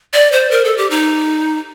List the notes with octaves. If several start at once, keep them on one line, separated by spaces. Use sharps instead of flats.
D5
C5
A#4
A4
G4
D#4